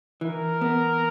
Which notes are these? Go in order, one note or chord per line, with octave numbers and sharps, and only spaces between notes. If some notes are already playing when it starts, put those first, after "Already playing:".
E3 A#4
B3